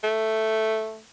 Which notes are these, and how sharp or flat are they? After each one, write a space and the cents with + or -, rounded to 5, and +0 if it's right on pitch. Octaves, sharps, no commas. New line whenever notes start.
A3 +0